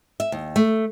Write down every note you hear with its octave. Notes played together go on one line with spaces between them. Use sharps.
E5
D#2
A3